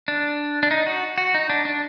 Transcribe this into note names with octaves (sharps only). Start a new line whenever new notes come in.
D4
D4
D#4
F#4
F#4
D#4
D4
D4